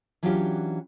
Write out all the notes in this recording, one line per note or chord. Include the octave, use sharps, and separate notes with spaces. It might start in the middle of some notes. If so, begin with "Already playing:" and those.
E3 F#3 C#4 D4 F4 G4